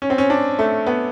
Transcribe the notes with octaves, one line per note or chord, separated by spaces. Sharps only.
C#4
C4
C#4
D4
A3
B3